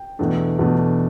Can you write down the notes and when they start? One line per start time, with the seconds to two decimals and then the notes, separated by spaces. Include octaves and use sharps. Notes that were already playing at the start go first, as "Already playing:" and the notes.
Already playing: G5
0.19 E2 B2 A3 D4
0.59 E2 B2 A3 D4